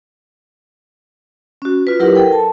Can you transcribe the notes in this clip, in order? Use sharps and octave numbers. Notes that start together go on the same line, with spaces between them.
C#4 F#4
F4 B4
F#3 E4 G4 A#4 B4 F#5
A4 A#4 G5
A5